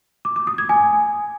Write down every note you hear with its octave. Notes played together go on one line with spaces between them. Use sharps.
D6
D6
D#6
G#6
G#5